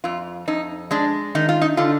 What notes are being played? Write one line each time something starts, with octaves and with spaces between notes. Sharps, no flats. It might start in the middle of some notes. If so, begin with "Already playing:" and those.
F2 F4
F2 D#4
G#3 D4
D#3 D#4
F4
D#4
D3 F4